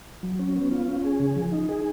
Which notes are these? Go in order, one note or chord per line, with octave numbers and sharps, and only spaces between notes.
F#3
C#4
B3
F4
C#4
G#4
C#3
F3
D#4
G#4